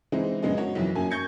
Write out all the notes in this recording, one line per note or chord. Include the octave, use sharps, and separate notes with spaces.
E3 G#3 C4 D#4 E4
A#1 F#2 C#3 G#3 B3 D#5
C#4 F#4 A#4 C#5
B1 F2 E3
F#2 A#3 G#5
C#6 G6 G#6 C#7